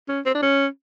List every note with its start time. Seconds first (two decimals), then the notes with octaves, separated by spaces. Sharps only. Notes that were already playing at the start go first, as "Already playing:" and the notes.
0.09 C#4
0.26 C4
0.35 D4
0.43 C#4